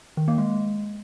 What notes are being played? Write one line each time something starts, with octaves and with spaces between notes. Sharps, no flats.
D#3
A#3
G#3